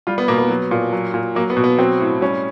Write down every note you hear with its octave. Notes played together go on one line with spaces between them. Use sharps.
G3 F4
B3
B2 A#3
B3
F#3
A#2
F#3
A#2
F#3 A#3
B3
B2
B3
F#3 C4
A2
G3 C#4